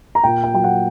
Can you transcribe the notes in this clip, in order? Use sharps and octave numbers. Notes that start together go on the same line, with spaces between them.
A#5
A#2 G5
G5
F#3 G5
F#5